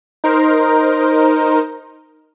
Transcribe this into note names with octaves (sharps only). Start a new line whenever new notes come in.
D#4 A#4 C5